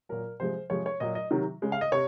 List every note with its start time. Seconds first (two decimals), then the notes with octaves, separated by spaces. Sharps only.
0.09 A#2 F#3 A#4
0.40 C3 F3 G#3 C5
0.70 C3 F3 G#3 C#5
0.86 C#5
1.00 A#2 F#3 D#5
1.15 D#5
1.31 C3 D#3 F#3
1.62 C#3 G#3
1.72 F5
1.81 D#5
1.92 C3 C#5